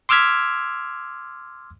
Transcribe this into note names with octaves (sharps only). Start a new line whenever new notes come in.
C6 D6 E6 F6 G#6 B6